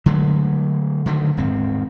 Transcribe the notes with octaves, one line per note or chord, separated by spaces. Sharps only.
D3 F#3 G#3 A3
D3 D#3 F#3 A3
D#1 G#2 C4